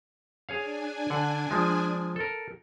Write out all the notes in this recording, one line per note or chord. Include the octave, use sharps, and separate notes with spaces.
D4 G#4 C#5 F5 G#5
D3 F#5
F3 G#3
A4 A#4